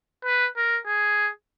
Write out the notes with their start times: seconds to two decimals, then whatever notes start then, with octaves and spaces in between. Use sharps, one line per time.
0.25 B4
0.57 A#4
0.87 G#4